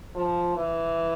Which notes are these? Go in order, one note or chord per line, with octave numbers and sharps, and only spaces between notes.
F3
E3